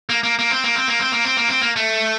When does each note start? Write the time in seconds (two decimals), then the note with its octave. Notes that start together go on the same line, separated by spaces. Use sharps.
0.09 A#3
0.23 A#3
0.39 A#3
0.51 C4
0.64 A#3
0.76 C4
0.88 A#3
1.00 C4
1.12 A#3
1.25 C4
1.37 A#3
1.49 C4
1.61 A#3
1.76 A3